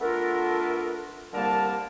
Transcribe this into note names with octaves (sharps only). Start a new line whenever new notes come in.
A3 B3 D4 F4 A4 A#4
C2 D3 G3 A#3 A#4 A5